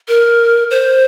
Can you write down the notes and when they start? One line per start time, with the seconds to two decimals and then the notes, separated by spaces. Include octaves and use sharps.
0.08 A#4
0.70 C5